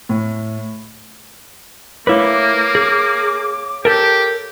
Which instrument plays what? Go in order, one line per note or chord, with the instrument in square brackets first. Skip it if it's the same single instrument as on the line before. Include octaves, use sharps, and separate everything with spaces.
[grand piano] A2
[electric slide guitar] A3 E4 B4 [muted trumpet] A#3 [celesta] C#5 F5 [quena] D6
[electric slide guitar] G#4
[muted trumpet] G4 [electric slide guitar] A4 A#4